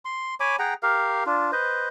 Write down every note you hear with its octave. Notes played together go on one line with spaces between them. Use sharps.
C6
C#5 G#5 B5 D6
G#4 F#5 G5 A#5
G4 A#4 F5
D4 F4
B4 C5 D#5